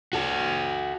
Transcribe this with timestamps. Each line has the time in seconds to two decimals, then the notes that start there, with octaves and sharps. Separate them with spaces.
0.13 F#4 A4